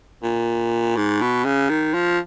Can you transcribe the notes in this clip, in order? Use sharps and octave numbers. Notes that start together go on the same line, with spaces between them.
A#2
G#2
B2
C#3
D#3
F3